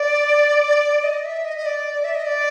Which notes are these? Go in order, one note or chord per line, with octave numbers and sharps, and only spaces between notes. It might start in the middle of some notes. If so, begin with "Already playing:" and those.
Already playing: D5
D#5
E5
D#5
D#5
D5
E5
D#5
D5